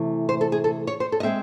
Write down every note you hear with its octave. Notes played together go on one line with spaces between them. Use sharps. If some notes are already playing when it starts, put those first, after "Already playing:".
Already playing: C3 E3 A3
C5
A4
G#4
A4
C#5
C5
A4
D#5
G#3 C4 E5